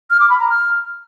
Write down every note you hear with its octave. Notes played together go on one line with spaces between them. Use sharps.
F6
D6
B5
A#5
F6